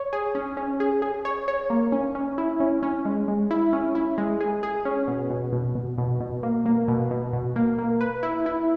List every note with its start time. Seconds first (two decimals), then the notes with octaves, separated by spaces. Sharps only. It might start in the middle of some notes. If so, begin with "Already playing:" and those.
Already playing: C#5
0.13 G#4
0.35 C#4
0.57 C#4
0.80 G#4
1.02 G#4
1.25 C#5
1.48 C#5
1.70 A#3
1.92 C#4
2.15 C#4
2.38 E4
2.60 C#4
2.83 C#4
3.05 G#3
3.28 G#3
3.51 E4
3.73 C#4
3.95 E4
4.18 G#3
4.41 G#4
4.63 G#4
4.85 C#4
5.07 B2
5.30 B2
5.52 B2
5.75 B2
5.98 B2
6.20 B2
6.43 A#3
6.66 A#3
6.88 B2
7.11 B2
7.33 B2
7.56 A#3
7.78 A#3
8.01 B4
8.23 E4
8.46 E4